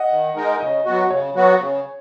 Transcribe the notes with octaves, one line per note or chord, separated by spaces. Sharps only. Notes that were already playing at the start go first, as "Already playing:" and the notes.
Already playing: D#5 F#5
D#3
G#3 D#4 A#4
C#3 D#5
F#3 B3 F#4
C#3 C#5
F#3 B3 F#4
C#3